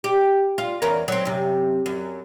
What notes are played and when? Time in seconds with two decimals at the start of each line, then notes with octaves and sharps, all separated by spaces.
0.04 G4
0.58 F4
0.82 E2 C#4 A#4
1.08 F#3 C4
1.25 F#2 C3
1.86 F#2